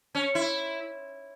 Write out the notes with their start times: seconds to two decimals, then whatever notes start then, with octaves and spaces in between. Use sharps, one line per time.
0.15 C#4
0.35 E4